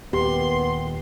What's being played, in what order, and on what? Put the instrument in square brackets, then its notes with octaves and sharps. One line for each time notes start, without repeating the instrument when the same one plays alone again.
[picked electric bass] D#1 D#2 [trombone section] A#3 B3 [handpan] G4 [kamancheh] C6